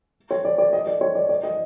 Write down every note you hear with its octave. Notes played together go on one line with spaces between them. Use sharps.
C#5
D5
D5
D#5
D5
C#5
D5
D5
D#5